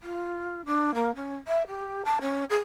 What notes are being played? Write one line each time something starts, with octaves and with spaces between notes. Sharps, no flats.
F4
D4
A#3
C#4
E5
G4
A5
C#4
G#4